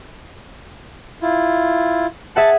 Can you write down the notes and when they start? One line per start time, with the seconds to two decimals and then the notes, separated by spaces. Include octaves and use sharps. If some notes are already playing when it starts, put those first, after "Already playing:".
1.22 E4 F4
2.36 G#4 E5 F#5 A5